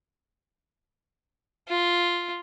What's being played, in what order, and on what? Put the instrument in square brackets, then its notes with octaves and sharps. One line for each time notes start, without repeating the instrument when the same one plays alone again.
[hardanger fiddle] F4